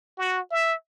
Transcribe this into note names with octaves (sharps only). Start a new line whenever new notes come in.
F#4
E5